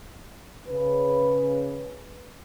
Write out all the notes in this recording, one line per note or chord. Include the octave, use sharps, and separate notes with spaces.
C#3 B4